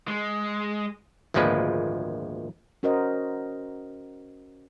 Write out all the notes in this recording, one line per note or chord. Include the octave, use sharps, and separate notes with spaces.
G#3
G#1 D2 A#2 F3 G#3 B4
C#4 F#4 A#4 C5 D#5